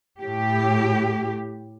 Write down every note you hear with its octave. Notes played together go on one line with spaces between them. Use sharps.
A2 G4